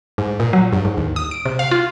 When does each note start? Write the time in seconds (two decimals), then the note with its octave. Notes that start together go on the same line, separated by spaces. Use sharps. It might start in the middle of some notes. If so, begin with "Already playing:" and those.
0.18 G#2
0.40 A#2
0.53 F#3
0.73 G2
0.85 G#2
0.97 D#2
1.16 D#6
1.31 D7
1.46 C3
1.59 F5
1.71 F4